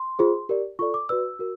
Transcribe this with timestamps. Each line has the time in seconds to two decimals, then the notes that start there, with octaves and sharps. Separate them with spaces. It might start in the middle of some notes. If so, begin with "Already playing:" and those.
Already playing: C6
0.19 F4 G#4 C5
0.49 G4 A#4 D5
0.79 F4 A4 D5 C#6
0.94 D6
1.09 F#4 B4 D5 E6
1.39 F#4 A#4